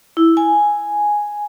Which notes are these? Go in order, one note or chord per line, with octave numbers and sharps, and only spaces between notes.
E4
G#5